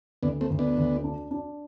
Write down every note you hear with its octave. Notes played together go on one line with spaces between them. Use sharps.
D2 B3 D4
A3 C4
D2
B3 D4
D2
D4
D4